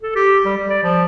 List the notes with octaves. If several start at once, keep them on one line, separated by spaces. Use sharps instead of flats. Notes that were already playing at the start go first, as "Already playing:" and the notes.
A4
G4
G3
G3
D5
F3